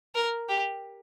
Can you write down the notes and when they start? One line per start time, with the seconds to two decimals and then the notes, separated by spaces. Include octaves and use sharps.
0.15 A#4
0.49 G4